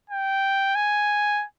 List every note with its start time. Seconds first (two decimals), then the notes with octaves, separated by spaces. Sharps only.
0.10 G5
0.75 G#5